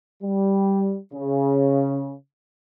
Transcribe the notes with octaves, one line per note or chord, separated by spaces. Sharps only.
G3
C#3